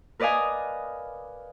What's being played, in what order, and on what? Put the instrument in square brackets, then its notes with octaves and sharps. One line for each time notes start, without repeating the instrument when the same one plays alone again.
[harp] A#4 B4 D5 D#5 F5 G#5